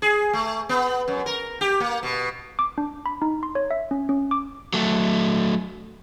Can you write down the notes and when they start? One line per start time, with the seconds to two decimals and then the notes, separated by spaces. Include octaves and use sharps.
0.02 G#4
0.33 A3
0.69 B3
1.08 F#2
1.26 A#4
1.61 G4
1.80 A#3
2.03 B2
2.59 D6
2.78 D4
3.06 B5
3.22 D#4
3.43 C6
3.55 C#5
3.71 E5
3.91 C#4
4.09 C#4
4.31 D6
4.73 F#3 A3